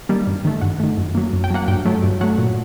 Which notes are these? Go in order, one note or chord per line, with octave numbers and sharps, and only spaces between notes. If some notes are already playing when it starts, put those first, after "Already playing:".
D#3 G3 A#3
G2
D#3 A3
G2 F#5
D#3 A3
F#2
F#3 A#3
F#2
G5
F#3 A#3 F#5
G2 G5
F#3 A3
G2
F#3 A3 F#5
A#2